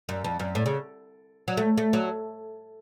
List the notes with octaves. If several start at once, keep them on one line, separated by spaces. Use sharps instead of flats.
F#2
F2
F#2
A2
C#3
F#3
A3
A3
F#3